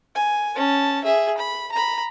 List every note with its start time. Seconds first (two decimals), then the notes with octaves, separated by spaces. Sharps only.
0.15 G#5
0.56 C#4 A5
1.04 G#4 E5
1.37 B5
1.72 A#5 B5